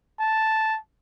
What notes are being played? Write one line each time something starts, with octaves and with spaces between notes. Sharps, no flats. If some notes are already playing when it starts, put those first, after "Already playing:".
A5